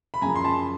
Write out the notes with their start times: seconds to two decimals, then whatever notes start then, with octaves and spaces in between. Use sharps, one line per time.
0.14 B5
0.22 F#2 C#3 F3 G#5 A#5
0.35 C6
0.44 A5 B5